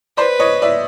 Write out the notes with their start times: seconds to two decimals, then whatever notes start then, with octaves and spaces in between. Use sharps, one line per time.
0.17 B4 C5 D5
0.40 C#5 D#5
0.62 D5 E5